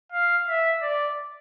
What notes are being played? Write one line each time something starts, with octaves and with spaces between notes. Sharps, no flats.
F5
E5
D5